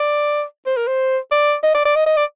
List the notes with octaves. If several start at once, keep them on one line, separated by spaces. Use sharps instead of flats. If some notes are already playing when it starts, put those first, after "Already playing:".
Already playing: D5
C5
A#4
C5
D5
D#5
D5
D5
D#5
D#5
D5